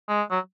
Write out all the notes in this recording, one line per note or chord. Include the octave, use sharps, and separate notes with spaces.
G#3
F#3